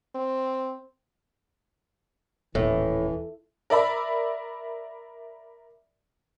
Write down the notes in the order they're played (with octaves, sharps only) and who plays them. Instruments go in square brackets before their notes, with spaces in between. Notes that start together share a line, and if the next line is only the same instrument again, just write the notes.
[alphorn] C4
[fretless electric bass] D#1 [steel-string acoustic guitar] A2 [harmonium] E3
[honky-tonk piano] A#4 D5 E5 B5